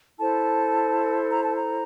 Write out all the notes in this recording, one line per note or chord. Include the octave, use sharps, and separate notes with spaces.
E4 A4 C5 A5
A#5
A5
A#5